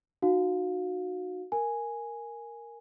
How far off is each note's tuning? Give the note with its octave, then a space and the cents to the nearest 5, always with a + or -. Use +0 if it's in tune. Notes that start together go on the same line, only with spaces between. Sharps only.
D#4 -25 F#4 -15 F5 +20
A#4 +0 G#5 +0